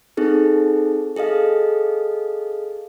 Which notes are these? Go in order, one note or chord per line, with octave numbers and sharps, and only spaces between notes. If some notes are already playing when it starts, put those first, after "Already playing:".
C4 D#4 G#4 A4
G#4 A4 D#5 F5